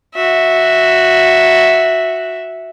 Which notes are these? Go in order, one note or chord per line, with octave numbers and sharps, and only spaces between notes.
F#4 E5